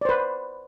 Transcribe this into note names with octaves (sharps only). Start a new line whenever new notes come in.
B4 C5 D5